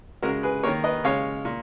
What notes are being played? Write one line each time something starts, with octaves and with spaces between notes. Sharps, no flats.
C#3 G#3 F#4 A#4
G#4 B4
D#3 A#3 A#4 C#5
B4 D#5
C#3 G#3 C#5 F5
A#2